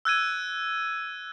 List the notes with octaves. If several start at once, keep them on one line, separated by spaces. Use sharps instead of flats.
E6 F#6 G#6 D#7